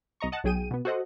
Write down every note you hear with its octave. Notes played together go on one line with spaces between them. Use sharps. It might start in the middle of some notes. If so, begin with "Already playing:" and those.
C2 D#5 A#5 C#6
D#5 F#5 A5
B1 F#3 G#4 G5 D#7
B2 B3
F#4 A4 C5 D#5 F#5